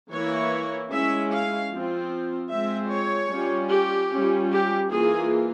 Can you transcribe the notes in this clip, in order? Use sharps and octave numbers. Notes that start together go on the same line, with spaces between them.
E3 A#3 E4 C#5
G#3 C#4 E4 E5
F5
F3 C4 F4
G#3 C4 F4 E5
C#5
G3 C#4 F4
G4
G3 C#4 F4
G4
E3 A#3 F4 G#4